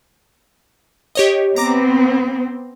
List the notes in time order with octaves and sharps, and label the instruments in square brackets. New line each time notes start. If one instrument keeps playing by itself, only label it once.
[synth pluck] G4 C#5 D#5
[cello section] B3 C4 [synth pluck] A#5 D6 A#6